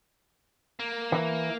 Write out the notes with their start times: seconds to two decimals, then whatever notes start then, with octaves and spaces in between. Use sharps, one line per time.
0.79 A#3
1.12 E3